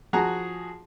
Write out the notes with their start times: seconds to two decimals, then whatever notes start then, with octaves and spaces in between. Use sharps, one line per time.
0.13 F3 F#4 G#4 F#5 A#5